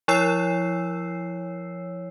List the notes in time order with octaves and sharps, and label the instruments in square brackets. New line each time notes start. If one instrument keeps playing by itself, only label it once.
[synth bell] F3 E4 C#5 E6 C7